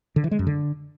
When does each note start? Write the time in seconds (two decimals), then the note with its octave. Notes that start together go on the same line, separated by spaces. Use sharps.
0.16 D3
0.24 E3
0.31 G#3
0.39 F#2
0.47 D3